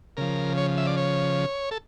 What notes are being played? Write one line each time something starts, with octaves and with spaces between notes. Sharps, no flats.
C#3 F3 A#4
C#5
E5
D5
C#5
A4